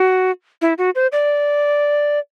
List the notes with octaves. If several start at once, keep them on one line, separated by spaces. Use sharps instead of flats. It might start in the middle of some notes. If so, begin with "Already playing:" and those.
Already playing: F#4
E4
F#4
C5
D5